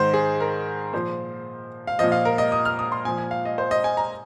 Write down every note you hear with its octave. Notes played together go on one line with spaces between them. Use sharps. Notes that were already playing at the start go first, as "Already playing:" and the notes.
Already playing: G#2 D#3 C5
G#4
A#4
A#2 F3 C5
F5
A#2 F3 D#5
F5
A#4
D#5
D#6
F6
D#6
C6
A#2 F3 G#5
G#5
F5
D#5
C5
D#5
G#5
A#5